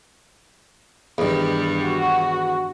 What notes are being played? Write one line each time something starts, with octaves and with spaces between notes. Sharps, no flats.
E2 G2 D#3 G3
F#4